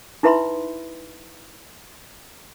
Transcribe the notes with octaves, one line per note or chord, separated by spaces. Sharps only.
D#4 E4 B4 E5 B5 C6